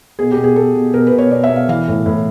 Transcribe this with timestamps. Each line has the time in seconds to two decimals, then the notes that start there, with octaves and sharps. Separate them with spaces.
0.19 B2 G#4
0.32 G4
0.38 B2
0.44 G#4
0.56 B2 A4
0.75 B2
0.93 B2 A#4
1.07 B4
1.12 B2
1.18 C#5
1.31 B2 D5
1.44 E5
1.49 B2
1.56 F5
1.68 E3 F5
1.88 A2
2.06 A2